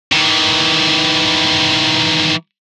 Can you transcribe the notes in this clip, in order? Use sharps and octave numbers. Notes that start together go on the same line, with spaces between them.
D#3 E3